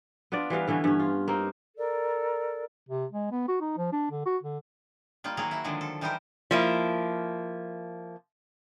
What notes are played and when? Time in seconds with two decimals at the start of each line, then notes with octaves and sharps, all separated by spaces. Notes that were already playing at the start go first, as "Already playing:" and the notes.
0.32 B3 D4 F4 D5
0.50 E3 G3 B3 F5
0.68 D3 E3 B3 C#4
0.84 G2 C#4
1.00 F4
1.28 A#3 C4 D#4
1.77 A4 A#4 D5
2.89 C3
3.12 G#3
3.32 B3
3.48 F#4
3.61 D#4
3.78 F3
3.93 D4
4.12 D3
4.26 F#4
4.43 D3
5.24 G3 A#3 D#4 F4
5.37 D#3 F#3 A#3 F#4 G#4 A#5
5.51 E4 F#4
5.64 D3 D#3 F3 F#3 G#3
5.81 A4
6.01 E3 G3 D#4 G4 A#4 C5
6.51 F3 A#3 E4